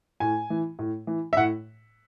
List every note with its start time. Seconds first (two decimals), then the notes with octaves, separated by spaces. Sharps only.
0.20 A2 G#5
0.50 E3
0.79 A2
1.07 E3
1.33 E5
1.37 A2 F#5